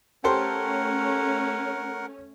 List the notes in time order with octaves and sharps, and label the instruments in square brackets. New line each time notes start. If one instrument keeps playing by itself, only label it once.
[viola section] A3 C#4 [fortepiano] G4 A4 C5 [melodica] A#4 F#5